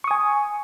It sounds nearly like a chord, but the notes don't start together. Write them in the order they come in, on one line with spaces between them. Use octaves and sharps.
C#6 D#6 G#5